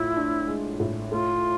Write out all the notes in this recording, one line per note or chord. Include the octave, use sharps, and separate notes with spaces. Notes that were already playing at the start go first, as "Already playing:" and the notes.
Already playing: A2 E4 F4
D4
G#3
A2
A3 F4